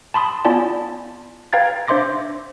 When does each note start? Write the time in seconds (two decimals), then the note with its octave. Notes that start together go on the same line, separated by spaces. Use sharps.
0.14 A5 B5 C6 D#6
0.45 B3 E4 F4 D5 G#5 A5
1.53 B4 F5 G5 A#5 G#6 A6
1.88 D4 C5 E5 C6 D6 A#6